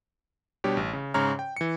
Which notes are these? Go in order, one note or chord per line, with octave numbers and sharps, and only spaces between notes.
B2 G3 D4 G4 C#5
A1
C#3
G#2 C#3 C#4 C#5 A#5 F6
G5
E3 C#7